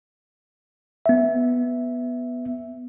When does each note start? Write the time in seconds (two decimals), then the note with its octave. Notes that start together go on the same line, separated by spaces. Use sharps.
1.06 B3 E5